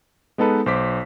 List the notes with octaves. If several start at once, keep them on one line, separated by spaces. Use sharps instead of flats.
G#3 B3 D#4 A4 B4
B1 C5 D6 B6